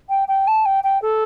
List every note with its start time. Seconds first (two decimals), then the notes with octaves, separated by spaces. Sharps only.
0.09 G5
0.28 G5
0.47 A5
0.65 G5
0.83 G5
1.02 A4